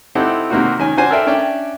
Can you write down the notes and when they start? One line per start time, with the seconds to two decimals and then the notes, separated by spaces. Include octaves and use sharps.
0.15 C4 D#4 E4 G4 A4 F#5
0.50 C3 D#3 A#3 C4 D#4 F#4
0.79 D#3 C#4 G#5
0.97 C#4 D4 F#4 C5 G#5
1.10 A4 A#4 C5 D5 E5 G5
1.26 C#4 D4 C#5 D5 E5 G5